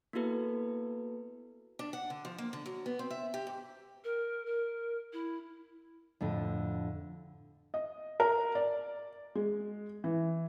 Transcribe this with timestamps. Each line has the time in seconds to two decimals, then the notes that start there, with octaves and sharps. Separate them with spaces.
0.13 A#3 B3 E4 F#4 A4 B4
1.79 D4
1.93 F#5
2.10 D3
2.25 F3
2.38 A#3
2.53 D3
2.66 F#3
2.86 B3
2.99 C4
3.11 E5
3.34 G4
3.47 G#2
4.04 A#4
4.46 A#4
5.13 E4
6.21 F2 A2 D3
7.74 D#5
8.20 A#4
8.55 D5
9.35 G#3
10.04 E3